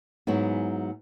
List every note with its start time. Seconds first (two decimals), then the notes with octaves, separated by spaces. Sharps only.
0.27 G#2 F#3 B3 E4 G#4